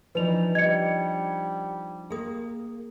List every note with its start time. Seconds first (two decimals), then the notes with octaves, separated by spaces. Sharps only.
0.15 E3 F3 D4 D#4 B4 F7
0.55 G3 D#5 G#6 C#7
2.10 A#3 G#4 D#6